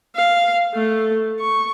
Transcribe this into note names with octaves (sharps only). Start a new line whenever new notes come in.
F5
A3
C#6